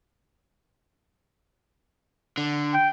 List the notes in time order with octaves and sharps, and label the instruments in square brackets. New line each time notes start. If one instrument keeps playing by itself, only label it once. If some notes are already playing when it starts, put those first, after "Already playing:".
[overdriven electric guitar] D3
[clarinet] G5